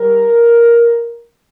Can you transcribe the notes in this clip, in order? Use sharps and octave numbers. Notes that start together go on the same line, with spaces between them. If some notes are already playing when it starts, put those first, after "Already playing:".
Already playing: G3 A#4